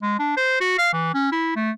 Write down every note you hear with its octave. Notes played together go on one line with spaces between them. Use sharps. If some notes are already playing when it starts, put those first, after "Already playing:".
G#3
D4
C5
F#4
F5
E3
C#4
E4
A3